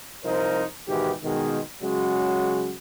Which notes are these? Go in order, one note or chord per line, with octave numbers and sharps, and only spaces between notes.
C2 C3 F3 D#4 A#4 C5
G#2 B2 D#3 E3 F#4 G4
B2 D#3 G#3
C#3 F#3 G#3 F#4